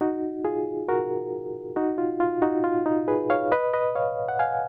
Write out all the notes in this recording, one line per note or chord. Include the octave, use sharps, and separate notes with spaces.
D#4 F#4
F4 G#4
F#4 A#4
D#4 F#4
F4
F4
D#4 F#4
F4
D#4
G#4 B4
C#5 F5
B4 D#5
B4 D#5
C#5 F5
F#5
F5 G#5